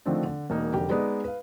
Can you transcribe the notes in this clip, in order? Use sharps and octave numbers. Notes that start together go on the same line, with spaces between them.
D3 D#3 F3 A3 C4 D4
D3
E1 A#3 D#4
F1 D3 G4 A#4
G#3 B3 D#4 B4 D5
B4 F5